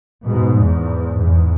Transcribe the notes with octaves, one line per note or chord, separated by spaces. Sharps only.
G#2 B2
E2 G#2
E2 G#2